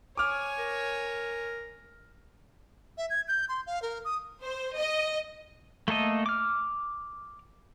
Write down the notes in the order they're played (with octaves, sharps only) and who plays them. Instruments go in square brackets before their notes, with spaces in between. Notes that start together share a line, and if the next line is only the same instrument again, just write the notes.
[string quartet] C#5 G#5 [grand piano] D6 F6
[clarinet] A#4
[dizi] E5
G#6
G6
C6
F5
A#4
D#6
[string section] C5
D#5
[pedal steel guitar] A3 A#3 A4 D#5
D6 F6